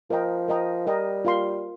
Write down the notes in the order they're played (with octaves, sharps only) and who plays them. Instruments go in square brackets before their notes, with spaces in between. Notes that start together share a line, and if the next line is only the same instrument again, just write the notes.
[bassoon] F3 [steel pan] A#4 D#5 G5 A#5
[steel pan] A#4 D#5 G5 A#5
[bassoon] G3 [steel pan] A#4 D#5 G5 A#5
[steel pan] F4 A#4 F5 C6